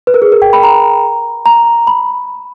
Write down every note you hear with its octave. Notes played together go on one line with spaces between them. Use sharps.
B4
A#4
G#4
A#4
G5
B5
A#5
A#5
B5